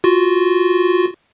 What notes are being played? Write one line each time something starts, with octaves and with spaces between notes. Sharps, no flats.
F4 F#4